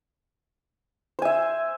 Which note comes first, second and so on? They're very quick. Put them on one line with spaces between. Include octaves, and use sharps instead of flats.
C5 G#5 E5